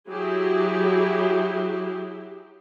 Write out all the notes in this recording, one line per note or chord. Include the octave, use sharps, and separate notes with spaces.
F#3 E4 G4 G#4